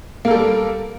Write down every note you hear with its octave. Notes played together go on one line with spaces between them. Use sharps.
G3 A#3 A4 A#4